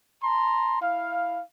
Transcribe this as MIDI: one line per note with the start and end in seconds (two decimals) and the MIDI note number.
0.23 0.80 81
0.23 0.80 82
0.23 0.80 84
0.81 1.41 64
0.81 1.41 77